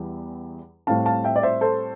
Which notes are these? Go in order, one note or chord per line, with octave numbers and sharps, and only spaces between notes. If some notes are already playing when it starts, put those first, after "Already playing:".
Already playing: E2 E3 G3
A2 G3 C4 F5 A5
F5 A5
E5 G5
D5
C5 E5
A4 C5